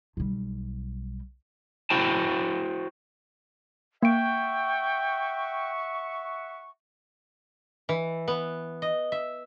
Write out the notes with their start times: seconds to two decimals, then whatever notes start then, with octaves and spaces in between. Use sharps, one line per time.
0.17 B1 G3
1.90 E4 F#4 C5 G5 A5
4.02 A#3 E5 F#5 G5 C#6 D7
7.89 E3
8.28 B3
8.82 D#5
9.12 E5